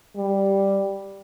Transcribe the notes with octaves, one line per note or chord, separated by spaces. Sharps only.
G3